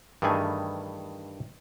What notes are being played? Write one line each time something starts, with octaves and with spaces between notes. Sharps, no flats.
G2 D#3 E3 A3 G#4 G#5